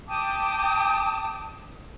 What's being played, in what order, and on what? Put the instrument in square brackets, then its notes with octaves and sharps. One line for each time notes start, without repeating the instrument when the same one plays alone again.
[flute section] G5 A5 D6 D#6